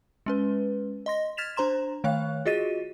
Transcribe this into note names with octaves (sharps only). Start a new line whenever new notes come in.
G#3 C#4 B4
D#5 C6 A#6
F6 G#6 A6 B6 E7 F7
D4 C5 A#5 C6 E7
D#3 A3 C#5 F5 F#6
F4 F#4 G#4 D#5 A6 D#7